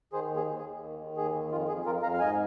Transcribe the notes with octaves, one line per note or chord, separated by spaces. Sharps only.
D#3 G#4 C5
D#2
G#4
D#2
G#4
D#2
D#3
D#3
D#2 G#4
D#3
F2 F4
F2 G#4
F2 F4 A#4
F2 F5 A#5
F5
G#2 D#5 G#5